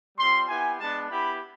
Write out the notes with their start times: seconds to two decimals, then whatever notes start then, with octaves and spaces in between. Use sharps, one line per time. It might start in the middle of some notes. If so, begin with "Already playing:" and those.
0.17 G3 C4 F4 C6
0.48 B3 E4 G4 G#5
0.79 G#3 B3 D4 A5
1.09 B3 E4 G4 B5